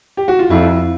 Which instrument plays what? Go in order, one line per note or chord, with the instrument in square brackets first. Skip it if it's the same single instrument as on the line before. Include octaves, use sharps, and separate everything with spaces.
[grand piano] G4
F#4
F4
[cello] F2 [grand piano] E4